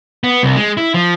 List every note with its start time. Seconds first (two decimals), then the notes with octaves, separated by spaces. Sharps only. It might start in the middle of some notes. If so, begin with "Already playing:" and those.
0.24 B3
0.43 C2
0.57 G#3
0.77 E4
0.94 F3